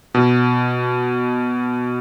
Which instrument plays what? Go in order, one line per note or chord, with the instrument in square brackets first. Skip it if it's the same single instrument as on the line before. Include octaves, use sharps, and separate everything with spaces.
[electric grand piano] B2